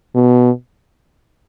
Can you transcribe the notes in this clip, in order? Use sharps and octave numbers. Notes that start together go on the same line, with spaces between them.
B2